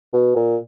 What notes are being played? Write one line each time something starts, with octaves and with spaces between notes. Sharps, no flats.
B2
A#2